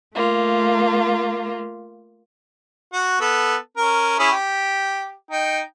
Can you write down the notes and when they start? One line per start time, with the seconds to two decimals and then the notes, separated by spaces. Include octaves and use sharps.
0.14 A3 A#3 F4
2.93 F#4
3.20 B3 A4
3.77 C#4 A#4
4.19 C#4 E4 G#4
4.31 G4
5.31 D#4 G5